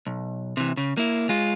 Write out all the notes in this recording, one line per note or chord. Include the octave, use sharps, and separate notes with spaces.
B1
C3 E3
C#3
A#3 E4
G#3 F4